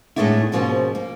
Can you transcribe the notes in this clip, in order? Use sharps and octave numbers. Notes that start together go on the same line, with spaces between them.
A2 G#3 A3 B3 D4 E4
G#2 B2 F3 A#3 C#4
A#3